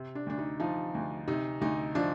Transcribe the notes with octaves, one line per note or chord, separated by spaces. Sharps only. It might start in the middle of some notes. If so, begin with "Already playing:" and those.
Already playing: C3
D4
D2 D4
D#4
F3 D#4
D2
C3 D#4
D2 D#4
F3 D4